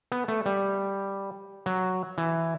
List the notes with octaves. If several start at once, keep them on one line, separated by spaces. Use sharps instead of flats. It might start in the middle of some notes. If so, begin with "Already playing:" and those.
B3
A3
G3
F#3
E3